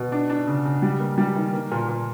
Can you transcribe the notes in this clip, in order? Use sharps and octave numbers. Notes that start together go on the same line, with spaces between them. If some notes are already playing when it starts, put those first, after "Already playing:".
Already playing: B2
D4
D4
C#3
C#3
G3
A#3
G3
D#3
A#3
A#2
A#2